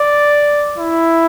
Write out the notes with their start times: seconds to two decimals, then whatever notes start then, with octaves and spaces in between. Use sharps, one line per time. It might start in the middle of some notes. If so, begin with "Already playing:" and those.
Already playing: D5
0.78 E4